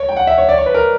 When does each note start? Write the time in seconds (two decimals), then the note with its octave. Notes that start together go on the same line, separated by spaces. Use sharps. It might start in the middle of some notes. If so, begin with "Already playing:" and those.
Already playing: C#5
0.09 G5
0.17 F#5
0.27 E5
0.38 C#5
0.49 D5
0.58 C#5
0.66 B4
0.74 A#4